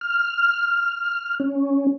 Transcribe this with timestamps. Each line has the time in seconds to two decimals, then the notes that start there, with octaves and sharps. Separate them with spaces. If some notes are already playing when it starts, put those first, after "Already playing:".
0.01 F6
1.40 C#4